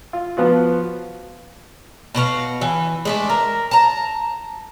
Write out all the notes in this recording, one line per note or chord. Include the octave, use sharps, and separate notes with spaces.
F4
F3 B3 F4 F#4
B2 F#4 A#4 F5
E3
G#3 A3 D4
A#4
A5 A#5